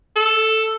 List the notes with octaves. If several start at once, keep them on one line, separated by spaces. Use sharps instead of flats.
A4